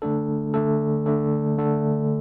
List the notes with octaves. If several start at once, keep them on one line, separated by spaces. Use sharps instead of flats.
D3 A3 D4 A4
D3 A3 D4 A4
D3 A3 D4 A4
D3 A3 D4 A4